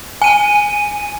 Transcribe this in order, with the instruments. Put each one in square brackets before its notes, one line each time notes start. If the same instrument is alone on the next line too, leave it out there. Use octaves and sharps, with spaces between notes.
[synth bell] G#5 D#7